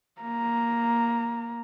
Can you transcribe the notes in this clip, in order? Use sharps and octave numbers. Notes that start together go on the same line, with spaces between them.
A#3 A#5